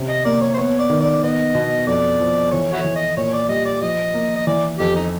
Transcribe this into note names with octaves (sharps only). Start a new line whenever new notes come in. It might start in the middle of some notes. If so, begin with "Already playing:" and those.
Already playing: C3 C#4
D#5
A#3 D5
C#5
C5
B3 C#5
D5
D#3
D5
B3 D#5
B2
F2 D5
F3
E3 C#5
E4 F#4 C#5
E3
D#5
A#2 C#5
D5
G3 D#5
D5
F3 D#5
A#3
D#5
E3 D5
F2 G4
D#4